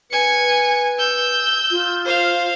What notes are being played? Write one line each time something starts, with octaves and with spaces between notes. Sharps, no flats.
B4 G#5 C#7
E6 G6
F4
C5 F5